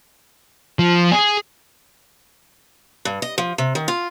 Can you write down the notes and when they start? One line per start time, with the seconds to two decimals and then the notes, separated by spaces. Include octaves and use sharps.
0.79 F3
1.12 G#4
3.05 G2
3.22 D#5
3.38 F3
3.58 C3
3.75 D#3
3.88 F4